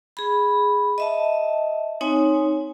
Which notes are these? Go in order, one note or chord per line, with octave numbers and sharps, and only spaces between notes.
G#4 B5
D#5 E5 A5
C4 D#4 C#5 G#5